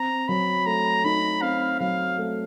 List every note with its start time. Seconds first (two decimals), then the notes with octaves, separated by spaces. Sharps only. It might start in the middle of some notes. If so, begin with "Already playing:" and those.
Already playing: C4 A#5
0.28 F#3 B5
0.66 A3 A#5
1.04 D#4 B5
1.42 C4 F5
1.80 F#3 F5
2.18 A3